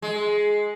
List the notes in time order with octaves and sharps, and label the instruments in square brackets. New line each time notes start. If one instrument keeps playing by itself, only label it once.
[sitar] G#3